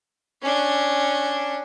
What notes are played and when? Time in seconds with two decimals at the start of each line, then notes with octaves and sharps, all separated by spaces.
0.42 C#4 D4